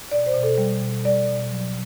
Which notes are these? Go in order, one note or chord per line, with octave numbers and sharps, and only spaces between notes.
B2 D5
C5
B2
A4
G3
B2
G3 D5
B2
F#3